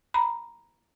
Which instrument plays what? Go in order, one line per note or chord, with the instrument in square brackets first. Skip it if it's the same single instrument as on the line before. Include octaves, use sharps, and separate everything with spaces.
[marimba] A#5 B5